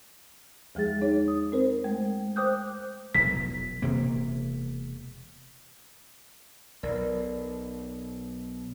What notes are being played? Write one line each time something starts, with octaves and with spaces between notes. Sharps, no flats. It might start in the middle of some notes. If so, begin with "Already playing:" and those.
E2 F3 G#3 G#4 A6
D#4 C#5
D#6
C4 A#4 C5
G#3 A3
C5 G5 D6 D#6 F#6 G6
F1 B1 B6
E1 C3 A#3
B1 A#4 D5